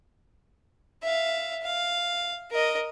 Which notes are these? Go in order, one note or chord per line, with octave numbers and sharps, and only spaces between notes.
E5 F5
F5
A#4 D#5